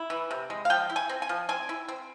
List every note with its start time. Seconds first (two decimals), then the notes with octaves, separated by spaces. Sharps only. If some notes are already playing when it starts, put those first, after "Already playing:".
Already playing: E4
0.10 E3
0.31 C3
0.50 G#3
0.65 F5
0.70 F3 G5
0.90 E4
0.96 G#5
1.09 C4
1.22 G#5
1.29 F3
1.49 C4 G#5
1.69 E4
1.88 C4